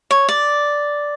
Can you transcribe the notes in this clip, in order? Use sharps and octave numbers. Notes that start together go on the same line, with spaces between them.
C#5
D5